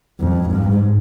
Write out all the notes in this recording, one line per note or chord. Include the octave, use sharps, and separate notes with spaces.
F2
G#2